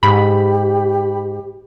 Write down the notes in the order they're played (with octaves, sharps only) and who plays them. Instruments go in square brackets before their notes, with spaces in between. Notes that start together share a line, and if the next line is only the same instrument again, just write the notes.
[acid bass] G#2 [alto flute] G4 [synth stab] B5